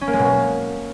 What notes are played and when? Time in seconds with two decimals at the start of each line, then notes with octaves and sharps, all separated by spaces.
0.01 C#4
0.07 A#3
0.13 G#3
0.19 B2
0.25 A#3